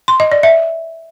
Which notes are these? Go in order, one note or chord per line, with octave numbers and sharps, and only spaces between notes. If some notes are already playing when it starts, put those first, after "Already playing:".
C6
D#5
D5
E5